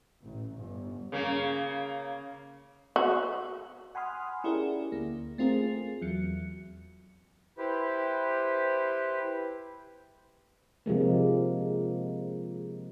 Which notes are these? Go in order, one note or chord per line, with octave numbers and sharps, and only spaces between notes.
A1
G1
C#3 A#3
F#4
F#5 G#5 B5 C6 D#6 F6
C#4 E4 G4 G#4 A#4 D5
D2 A#3
A3 C4 F4 G#4 A#4
E2 F#3 C#7
E4 G4 B4 C5
C3 F3 G#3 A#3